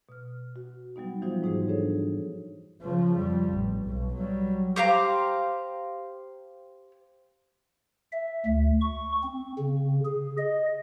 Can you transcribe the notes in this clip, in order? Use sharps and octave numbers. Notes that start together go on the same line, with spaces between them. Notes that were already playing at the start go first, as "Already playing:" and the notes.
B2 F6
F#4
F#3 G3 B3 D#4
E3 F3 D#4 F4 F#4 C5
G#2 D#4 G#4 C5
D4 G#4 A4 C#5
C#3 F3
F2 G3
A1
B1
F#3 G3
G4 C5 F5 A#5
E5
D2
C#6
C4
C#3
G#4
D#5